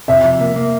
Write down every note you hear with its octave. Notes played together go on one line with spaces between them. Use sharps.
C3 E5
F3
A#3
A#3